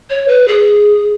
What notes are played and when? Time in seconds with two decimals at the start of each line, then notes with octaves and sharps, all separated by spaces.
0.10 C#5
0.28 B4
0.48 G#4